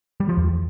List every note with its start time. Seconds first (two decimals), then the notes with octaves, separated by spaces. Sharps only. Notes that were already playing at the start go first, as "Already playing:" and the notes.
0.20 G3
0.29 F3
0.37 E2